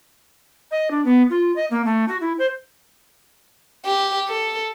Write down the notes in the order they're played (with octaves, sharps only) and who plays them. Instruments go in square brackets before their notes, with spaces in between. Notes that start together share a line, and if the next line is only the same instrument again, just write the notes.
[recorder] D#5
D4
B3
F4
D#5
A#3
A3
F#4
E4
C5
[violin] G4
A4